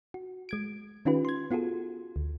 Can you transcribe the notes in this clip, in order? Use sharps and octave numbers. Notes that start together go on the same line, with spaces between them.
F#4
G#3 G#6 D7
D#3 C#4 D#4 F4 G4 B4
C6 G#6
B3 F4 F#4 G#4 A4
D2